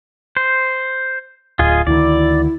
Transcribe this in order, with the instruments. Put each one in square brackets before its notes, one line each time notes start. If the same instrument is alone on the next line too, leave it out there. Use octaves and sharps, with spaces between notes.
[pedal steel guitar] C5
[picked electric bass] D1 [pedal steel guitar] F4 G#4 D#5
[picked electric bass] D2 D#3 [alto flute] E4 [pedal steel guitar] D5